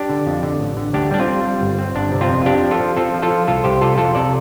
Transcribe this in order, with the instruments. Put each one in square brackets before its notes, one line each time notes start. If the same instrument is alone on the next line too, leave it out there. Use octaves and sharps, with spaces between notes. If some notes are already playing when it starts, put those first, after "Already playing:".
Already playing: [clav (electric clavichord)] D4 G4
D3
F2
D3
A1
D3
D2 D4 G4
G3 D4
C4 F4
G3
G3
G1
C4
G1 D4
C3
C4 F4
F2
F4
C4 D4 G4
F3
F4 A4
F3
C4 F4 A4
F3
F4 A4
F3
C2 F4 A4
C2 G4 C5
C3 F4 A4
F2 F4 A4
C3 A4 D5